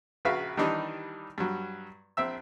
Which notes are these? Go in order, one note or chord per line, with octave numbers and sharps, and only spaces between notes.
A#1 C#3 F#4 B4 E5 F5
D#3 E3 G3 D4 D#4
G2 F#3
A#1 C4 E5 E6